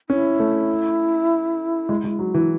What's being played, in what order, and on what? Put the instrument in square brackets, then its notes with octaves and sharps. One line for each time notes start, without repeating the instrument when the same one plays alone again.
[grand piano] C#4 [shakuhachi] E4
[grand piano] A3
G#3
G#3
F#3
E3